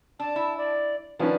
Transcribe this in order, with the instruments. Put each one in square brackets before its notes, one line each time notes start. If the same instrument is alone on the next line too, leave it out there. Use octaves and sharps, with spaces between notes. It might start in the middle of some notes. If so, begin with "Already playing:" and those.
[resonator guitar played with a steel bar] D4 [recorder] A5
[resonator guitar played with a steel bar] E4
[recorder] D5
[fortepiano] D#3 F3 C#4 [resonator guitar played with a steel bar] D4 [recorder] B4